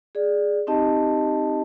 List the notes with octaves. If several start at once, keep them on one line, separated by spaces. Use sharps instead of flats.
G#4 D5
C4 D#4 G4 D#5 A5